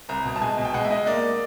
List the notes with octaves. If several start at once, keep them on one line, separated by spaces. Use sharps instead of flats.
C2 A#5
B2
A5
G#3 G#5
B2
G5
G#3 F#5
E5
G#3 D#5
A#3 D5